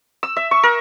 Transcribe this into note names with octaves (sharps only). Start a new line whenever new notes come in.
E6
E5
C#6
A#4